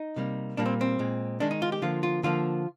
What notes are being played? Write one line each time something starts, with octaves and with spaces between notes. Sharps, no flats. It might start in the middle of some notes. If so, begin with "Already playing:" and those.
Already playing: D#4
C3 G3 A#3
A#2 G3 A#3 D4
C4
C4
A#2 G#3
D#3 G#3 D4
D#4
F4
G4
D3 F3 A#3 F4
F4
D3 F3 A#3 F4